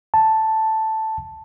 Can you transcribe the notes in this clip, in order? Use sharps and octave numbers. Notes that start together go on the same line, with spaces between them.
A5